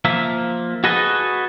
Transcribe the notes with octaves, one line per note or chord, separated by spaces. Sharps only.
F3 A#3 E5
F#4 G#4 A4 B4 D#5